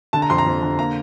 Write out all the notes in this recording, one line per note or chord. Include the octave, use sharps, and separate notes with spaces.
D3 A5
A#5
F2 C6
A#5
F2
D3
A#3 A#5